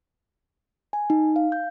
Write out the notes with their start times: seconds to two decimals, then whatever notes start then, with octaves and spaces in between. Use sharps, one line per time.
0.93 G#5
1.10 D#4
1.36 F5
1.52 G6